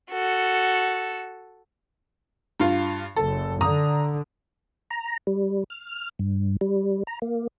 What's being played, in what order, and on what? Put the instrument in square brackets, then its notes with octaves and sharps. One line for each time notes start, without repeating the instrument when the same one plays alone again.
[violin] F#4 A4
[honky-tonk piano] G2 F4
[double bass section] F#1 [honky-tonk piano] A4
[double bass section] D3 [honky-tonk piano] A#5 D#6
[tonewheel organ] A#5
G3
F6
G2
G3
A#5
A#3